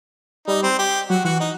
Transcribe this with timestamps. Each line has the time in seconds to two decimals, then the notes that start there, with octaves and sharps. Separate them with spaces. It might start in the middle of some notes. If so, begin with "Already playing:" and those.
0.48 G3 D#4
0.63 C4
0.79 G4
1.10 F#3 F#4
1.25 E3 F#4
1.40 D#4